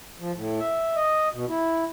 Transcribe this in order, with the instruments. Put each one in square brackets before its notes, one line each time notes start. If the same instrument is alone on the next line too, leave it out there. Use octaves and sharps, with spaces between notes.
[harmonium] F3
A2
E5
D#5
B2
E4